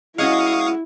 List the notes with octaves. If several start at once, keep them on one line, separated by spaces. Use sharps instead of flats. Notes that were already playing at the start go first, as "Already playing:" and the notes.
G#3 C#4 E4 F#4 F5 C#6 D#6